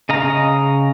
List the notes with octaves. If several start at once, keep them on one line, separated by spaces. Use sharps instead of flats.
C#3 D#5 F5 A#5